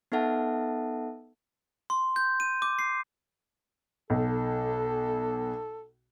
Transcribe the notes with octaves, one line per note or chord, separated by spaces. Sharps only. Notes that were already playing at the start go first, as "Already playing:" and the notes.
B3 D#4 A4 E5 F#5 A5
C6
G6
D#7
D6
C7
B1 A4